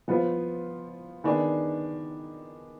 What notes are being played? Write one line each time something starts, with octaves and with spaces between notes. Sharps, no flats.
F3 B3 F4 C5
D#3 B3 D4 G#4